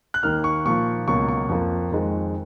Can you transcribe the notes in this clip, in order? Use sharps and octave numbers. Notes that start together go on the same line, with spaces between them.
F#6
D#2 D#3 A#3 F6
C#6
A#2 F3 A#3 C#6
C#2 B2 F#3 A#3 C#6
C#6
F2 F3 A#3
F2 D#3 G#3